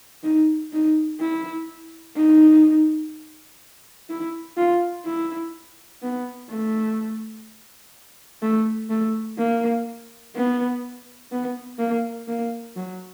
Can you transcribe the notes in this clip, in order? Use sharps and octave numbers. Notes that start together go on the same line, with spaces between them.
D#4
D#4
E4
D#4
E4
F4
E4
B3
A3
A3
A3
A#3
B3
B3
A#3
A#3
F#3